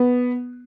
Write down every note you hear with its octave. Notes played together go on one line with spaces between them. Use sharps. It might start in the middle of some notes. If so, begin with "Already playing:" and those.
Already playing: B3